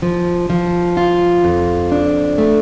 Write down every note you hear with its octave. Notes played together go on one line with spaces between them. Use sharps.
F3
F3
F4
F2
D4
A3